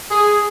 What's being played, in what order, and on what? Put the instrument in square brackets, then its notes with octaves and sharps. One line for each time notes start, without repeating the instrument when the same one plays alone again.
[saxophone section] G#4